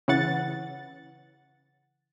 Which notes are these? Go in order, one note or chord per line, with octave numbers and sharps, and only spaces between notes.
C#3 E3 F#5 A6